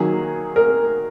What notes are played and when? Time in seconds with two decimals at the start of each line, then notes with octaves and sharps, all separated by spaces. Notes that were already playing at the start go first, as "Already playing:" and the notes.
Already playing: D#3 F#3 A#3 G#4
0.56 A#4